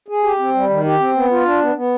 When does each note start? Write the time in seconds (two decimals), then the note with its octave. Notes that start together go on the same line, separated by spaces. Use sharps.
0.08 G#4
0.24 G4
0.39 C4
0.55 G3
0.69 D#3
0.85 G4
1.00 C4
1.15 B3
1.31 F4
1.45 D4
1.61 B3
1.75 B3